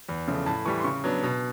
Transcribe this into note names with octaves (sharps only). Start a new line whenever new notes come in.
E2
C#3 F3 A3
A2 A5
E3 G3 C#6
C6
C#3 C#6
F#3 B3 D4
B2